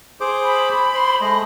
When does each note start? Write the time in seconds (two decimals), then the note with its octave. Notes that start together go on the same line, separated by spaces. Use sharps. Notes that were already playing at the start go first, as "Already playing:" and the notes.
0.20 G#4 C5 D6
0.43 B5
0.95 C5 C6
1.21 G#3 A3 D#5